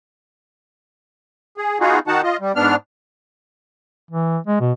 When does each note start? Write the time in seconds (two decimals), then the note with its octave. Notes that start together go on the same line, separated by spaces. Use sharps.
1.57 G#4
1.80 B3 D#4 F4 F#4 G#4
2.07 D#3 D#4 F#4 F#5 A5
2.23 F4 D#5
2.40 G3
2.56 G#2 B3 D4 F6
4.11 E3
4.47 G#3
4.60 B2